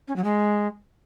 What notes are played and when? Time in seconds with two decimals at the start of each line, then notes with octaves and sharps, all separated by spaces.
0.08 C#4
0.16 F#3
0.24 G#3